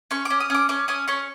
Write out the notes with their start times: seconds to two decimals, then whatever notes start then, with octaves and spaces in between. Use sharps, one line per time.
0.11 C#4 C#6
0.25 C#4 D6
0.40 D#6
0.50 C#4 D6
0.69 C#4 D6
0.88 C#4 D#6
1.08 C#4 C#6